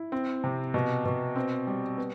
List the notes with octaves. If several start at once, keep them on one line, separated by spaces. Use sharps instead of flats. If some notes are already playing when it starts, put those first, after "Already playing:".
Already playing: E4
C4
C3
B2
B2
C4
G3
B3